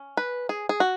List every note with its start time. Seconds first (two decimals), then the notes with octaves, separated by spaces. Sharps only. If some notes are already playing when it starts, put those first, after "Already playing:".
Already playing: C#4
0.17 B4
0.49 G#4
0.69 G#4
0.80 F#4